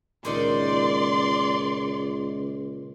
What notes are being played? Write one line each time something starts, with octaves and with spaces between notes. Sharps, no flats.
C#2 A#2 D#3 D#4 D5 C6